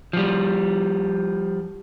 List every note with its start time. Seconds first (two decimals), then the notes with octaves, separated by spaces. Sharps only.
0.13 F3 G3